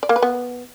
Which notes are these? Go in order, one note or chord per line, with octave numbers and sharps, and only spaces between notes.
D5
A#3
B4
B3